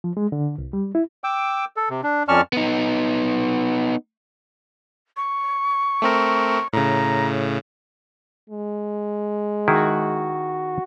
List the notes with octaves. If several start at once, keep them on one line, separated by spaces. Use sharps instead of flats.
F3
G#3
D3
C2
G3
E4
G5 D6 E6
A4
C3
D4
F2 C#4 D5 A5 C#6 F6
B3 D#4
C#6
A3 C4 A#4
A2 C#3 A#5
G#3
D#3 E4 F#4 G#4